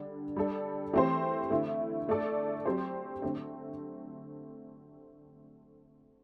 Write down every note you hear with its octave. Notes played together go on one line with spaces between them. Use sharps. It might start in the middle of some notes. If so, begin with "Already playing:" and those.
Already playing: D3 G3 D4
G3 D4 A4
E3 A3 C4 G4 C5
D3 A3 E4
A3 D4 A4 D5
F#3 C4 G4 C5
D3 A3 C4